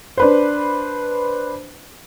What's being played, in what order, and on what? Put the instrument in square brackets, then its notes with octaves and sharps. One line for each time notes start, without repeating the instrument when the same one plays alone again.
[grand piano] D4 B4 C5